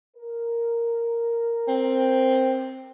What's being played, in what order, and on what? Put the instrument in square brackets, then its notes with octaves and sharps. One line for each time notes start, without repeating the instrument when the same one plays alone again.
[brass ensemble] A#4
[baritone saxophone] C4